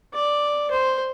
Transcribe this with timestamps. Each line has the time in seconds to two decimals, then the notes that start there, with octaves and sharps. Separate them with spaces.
0.14 D5
0.71 C5